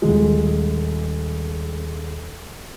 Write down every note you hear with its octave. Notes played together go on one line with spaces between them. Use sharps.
D#1 G#3